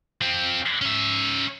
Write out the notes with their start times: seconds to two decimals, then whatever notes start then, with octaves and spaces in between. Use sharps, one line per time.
0.21 F3 C4
0.82 C#4 E5